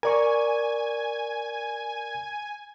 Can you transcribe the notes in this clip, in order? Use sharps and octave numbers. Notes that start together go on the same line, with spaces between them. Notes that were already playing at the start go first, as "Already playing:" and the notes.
A#4 D5 G#5 C#6